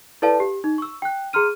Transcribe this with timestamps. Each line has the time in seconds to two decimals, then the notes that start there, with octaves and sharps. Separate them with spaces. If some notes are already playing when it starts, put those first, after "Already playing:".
0.22 E4 A4 B4 D5 F5 A5
0.40 G4
0.64 D#4
0.78 C#6 E6
1.02 G5 F#6
1.33 G#4 A#5 C6 F6 D#7